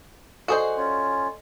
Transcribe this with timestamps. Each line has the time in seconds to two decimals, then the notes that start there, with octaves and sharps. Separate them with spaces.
0.48 F#4 G#4 A4 C5 D5 D#5
0.77 C#4 F4